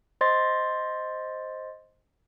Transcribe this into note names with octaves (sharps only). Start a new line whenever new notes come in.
C5 D#5 C6 A6